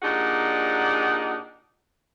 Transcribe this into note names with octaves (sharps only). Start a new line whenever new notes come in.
A#2 D4 D#4 G4 G#4 F#5